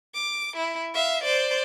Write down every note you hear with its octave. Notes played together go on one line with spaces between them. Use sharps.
D6
E4
E5 F5
C5 D5